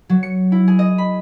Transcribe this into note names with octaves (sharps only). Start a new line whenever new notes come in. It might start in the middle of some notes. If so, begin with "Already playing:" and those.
F#3
C#7
E4
G#4
D#5
B5